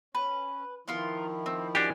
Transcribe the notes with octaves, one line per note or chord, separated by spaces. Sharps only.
C#4 B4
D#3 F3 B3 E4 F4 A#4
C4
D4 F#4 G4 G#5